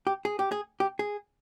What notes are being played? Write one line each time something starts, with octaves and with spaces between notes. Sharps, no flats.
G4
G#4
G4
G#4
G4
G#4